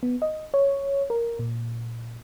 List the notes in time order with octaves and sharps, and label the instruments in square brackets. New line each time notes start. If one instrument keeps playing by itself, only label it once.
[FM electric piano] B3
D#5
C#5
A#4
A#2